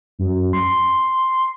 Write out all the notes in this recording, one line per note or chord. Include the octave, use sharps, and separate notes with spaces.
F#2
C6